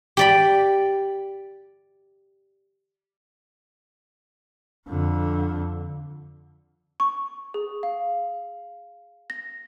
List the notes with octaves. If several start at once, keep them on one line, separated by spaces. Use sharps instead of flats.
G4 D5 B5
F2 D3
C#6
G#4
F5
A#6